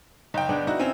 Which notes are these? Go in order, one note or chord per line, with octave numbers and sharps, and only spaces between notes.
F#1 D#4 G5
B3 D4 G#4
D#4 E4 F#4
C4 C#4 E4